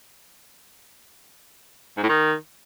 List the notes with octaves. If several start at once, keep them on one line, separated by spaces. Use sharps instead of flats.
G#2
A2
D#3